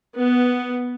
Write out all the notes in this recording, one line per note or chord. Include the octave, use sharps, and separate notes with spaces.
B3